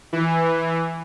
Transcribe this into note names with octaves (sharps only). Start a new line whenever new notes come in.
E3